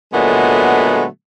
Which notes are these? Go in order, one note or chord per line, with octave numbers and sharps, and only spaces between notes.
A#2 D3 F#3 G#3 A3 B3